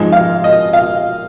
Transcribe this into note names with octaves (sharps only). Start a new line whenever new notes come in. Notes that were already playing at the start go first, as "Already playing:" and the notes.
Already playing: G#2 F3 G#3
F5
D#5
F5